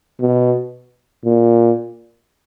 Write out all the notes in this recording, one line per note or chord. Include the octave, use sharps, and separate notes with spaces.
B2
A#2